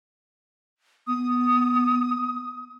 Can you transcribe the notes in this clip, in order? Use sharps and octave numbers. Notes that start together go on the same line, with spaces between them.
B3 D#6